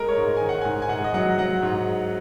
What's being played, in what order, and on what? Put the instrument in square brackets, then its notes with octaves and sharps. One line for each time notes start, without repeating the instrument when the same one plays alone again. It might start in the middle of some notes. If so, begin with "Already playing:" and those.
Already playing: [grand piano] G#3 A#4
C#5
G#2
D#3 G#5
F#5
G#2 G#5
G#5
G#2 F#5
D#5
F#3 F#5
F#3 F#5
G#2